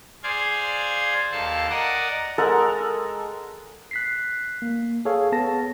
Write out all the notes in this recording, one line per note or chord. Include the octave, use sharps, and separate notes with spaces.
G#4 C5 D5 F5 G#6
D#2 A4 F5 A5
A#4 D5 D#5 F#5
G#3 A4 A#4 F#5
F#6 B6 C7
A#3
G#4 A4 C#5 F5
B3 A5 A#6